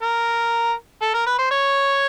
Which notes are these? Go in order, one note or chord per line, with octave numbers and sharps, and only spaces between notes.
A#4
A4
A#4
B4
C5
C#5